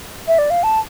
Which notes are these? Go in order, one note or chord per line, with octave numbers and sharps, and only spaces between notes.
E5
D5
F5
A5